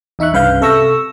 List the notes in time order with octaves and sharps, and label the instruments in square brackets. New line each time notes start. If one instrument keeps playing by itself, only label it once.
[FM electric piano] E2 D#4 E5 C#6 F#6
C2 G2 C#3 B4 F5 G6
C3 A4 E5 C#6 E6 A#6